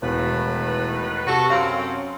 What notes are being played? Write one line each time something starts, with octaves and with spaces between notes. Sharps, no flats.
E1 A2 D#3 B4
C3 F#4 A4
F#2 C4 C#4 F5 C6